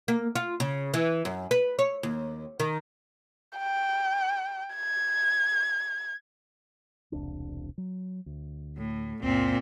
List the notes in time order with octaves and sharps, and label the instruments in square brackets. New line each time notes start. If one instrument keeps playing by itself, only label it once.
[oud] A#3
F4
C#3
E3
F#2
B4
C#5
D#2
D#3
[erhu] G5
G#6
[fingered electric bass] E1 C2 D4
F#3
D2
[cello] A2
[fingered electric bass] C#2 F#2 [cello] A#2 C4